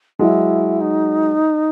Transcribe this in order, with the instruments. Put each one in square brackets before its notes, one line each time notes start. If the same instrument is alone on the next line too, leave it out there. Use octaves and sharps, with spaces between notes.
[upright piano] F#3 G#3 [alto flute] E4
[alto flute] D#4